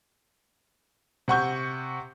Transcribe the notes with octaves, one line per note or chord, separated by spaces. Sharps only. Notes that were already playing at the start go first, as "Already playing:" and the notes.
C3 F#5 C#6 G6